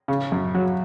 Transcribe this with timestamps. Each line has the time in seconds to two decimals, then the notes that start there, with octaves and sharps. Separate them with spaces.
0.08 C#3
0.32 F#2
0.55 F#3